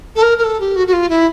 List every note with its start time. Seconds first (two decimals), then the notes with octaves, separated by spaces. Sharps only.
0.15 A4
0.22 A#4
0.38 A#4
0.44 A4
0.60 G4
0.75 F#4
0.87 F#4
0.93 F4
1.09 E4